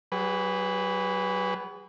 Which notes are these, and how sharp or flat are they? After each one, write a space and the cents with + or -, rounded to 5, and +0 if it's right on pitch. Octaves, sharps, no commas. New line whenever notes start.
F#3 +35 G#4 -30 B4 +0